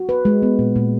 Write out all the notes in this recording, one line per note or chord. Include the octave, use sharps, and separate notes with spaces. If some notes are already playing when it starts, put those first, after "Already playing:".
Already playing: F#4
B4
G#3
B3
A#2
A#2